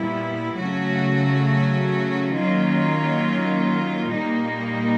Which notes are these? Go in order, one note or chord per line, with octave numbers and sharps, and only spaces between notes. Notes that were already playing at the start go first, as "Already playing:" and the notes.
Already playing: A#2 G3 B3 E4
C#3 F#3 A3 C#4 F#4
D#3 F#3 A#3 C#4 F4
A#2 G3 A#3 D#4